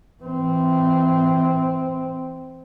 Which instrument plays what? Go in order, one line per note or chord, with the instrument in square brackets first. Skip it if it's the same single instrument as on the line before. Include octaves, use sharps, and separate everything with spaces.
[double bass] E3 C4